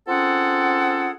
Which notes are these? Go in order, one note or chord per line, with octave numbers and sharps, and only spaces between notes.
C4 C#4 F4 G#4 A4 F#5